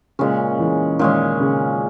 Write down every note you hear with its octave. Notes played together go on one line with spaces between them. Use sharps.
A#2 C#3 G#3 C#4
E3
A#2 D#3 G#3 C#4
C#3